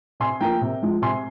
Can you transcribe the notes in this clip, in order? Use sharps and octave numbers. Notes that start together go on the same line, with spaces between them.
C3 G#5 C6
F3 A#3 G5 A#5
C3
F3 G#3
C3 G#5 C6